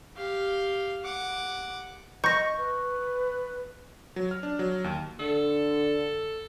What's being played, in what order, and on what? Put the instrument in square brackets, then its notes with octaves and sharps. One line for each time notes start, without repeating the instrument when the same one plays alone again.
[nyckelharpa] G4 F5
F#5 D6
[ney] D#5 [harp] C#6 [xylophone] G6 A#6
[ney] B4
[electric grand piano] F#3
F6
D4
F#3
D#2
[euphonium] D3 [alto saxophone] A4